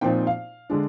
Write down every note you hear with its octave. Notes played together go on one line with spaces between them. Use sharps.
A#2 F3 C4 D#4 G5
F5
D3 G#3 D4